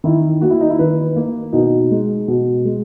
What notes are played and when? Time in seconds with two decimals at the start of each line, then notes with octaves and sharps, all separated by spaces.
0.04 D#3 E4
0.41 A#3 F#4
0.50 E4
0.61 D#4
0.70 E4
0.79 D#3 B4
1.16 A#3
1.53 B2 D#4
1.91 G#3
2.28 B2
2.65 G#3